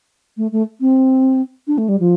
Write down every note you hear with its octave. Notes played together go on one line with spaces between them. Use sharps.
A3
A3
C4
D4
A3
G3
F3